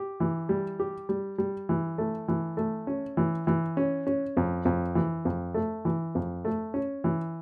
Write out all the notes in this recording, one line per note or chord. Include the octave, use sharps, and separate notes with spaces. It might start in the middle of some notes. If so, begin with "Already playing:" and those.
Already playing: G4
E3
G3
G4
G3
G3
E3
A3
E3
A3
C#4
E3
E3
C#4
C#4
F2
F2
E3
F2
A3
E3
F2
A3
C#4
E3